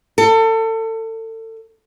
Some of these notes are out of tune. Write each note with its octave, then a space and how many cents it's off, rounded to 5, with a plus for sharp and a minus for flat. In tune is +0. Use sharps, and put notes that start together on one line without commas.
A4 +30